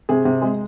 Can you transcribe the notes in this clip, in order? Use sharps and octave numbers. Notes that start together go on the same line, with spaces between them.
C3 G#4
C3
G#3